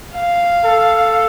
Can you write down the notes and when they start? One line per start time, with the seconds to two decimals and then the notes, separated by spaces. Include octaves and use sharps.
0.14 F5
0.65 A4